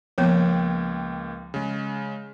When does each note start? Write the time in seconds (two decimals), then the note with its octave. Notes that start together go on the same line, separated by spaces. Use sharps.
0.18 C#2 F3 A#3 B3 G5
1.54 C#3 G#3